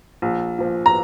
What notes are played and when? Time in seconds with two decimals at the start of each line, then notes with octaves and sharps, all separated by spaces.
0.22 A#1
0.58 A#2 F3
0.86 A#5